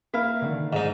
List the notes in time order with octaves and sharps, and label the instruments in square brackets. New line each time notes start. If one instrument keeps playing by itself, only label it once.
[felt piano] A#3 [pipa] E4 F5
[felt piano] D3 D#3
[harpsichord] G#2 D#4